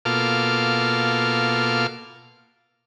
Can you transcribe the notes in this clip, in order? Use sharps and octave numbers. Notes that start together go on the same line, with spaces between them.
B2 A#3 F4 A4 D6 F6